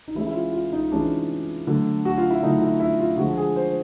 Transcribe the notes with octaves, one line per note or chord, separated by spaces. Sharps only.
D#4
E3 G#3 C#4 E4
E4
F4
F4
D#4
E3 G#3 C#4 D4
D3 F#3 A3
F#4
F4
E4
D3 F#3 A3 D#4
E4
E4
F4
D3 F3 G#3 F#4
G#4
C5